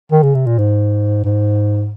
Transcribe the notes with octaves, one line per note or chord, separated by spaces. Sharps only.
D#3
C#3
C3
A#2
G#2
G#2